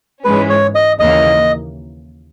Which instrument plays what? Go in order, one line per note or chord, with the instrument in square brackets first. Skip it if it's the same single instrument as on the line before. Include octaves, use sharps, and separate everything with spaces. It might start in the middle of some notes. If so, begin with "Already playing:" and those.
[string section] G#2 E3 G#3 C#4 [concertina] B4
[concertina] C#5
D#5
[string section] D#2 C#3 E3 A#3 [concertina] D#5